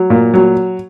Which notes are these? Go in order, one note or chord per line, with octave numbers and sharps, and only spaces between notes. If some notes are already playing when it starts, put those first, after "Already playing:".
Already playing: F#3
A#2
F#3